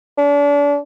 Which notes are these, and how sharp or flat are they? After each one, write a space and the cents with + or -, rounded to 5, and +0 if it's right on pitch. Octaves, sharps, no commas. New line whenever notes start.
D4 -35